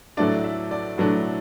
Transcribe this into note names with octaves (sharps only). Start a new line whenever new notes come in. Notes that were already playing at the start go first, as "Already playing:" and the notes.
A2 F#3 A3 D4 D5
E5
D5
A2 F#3 A3 D4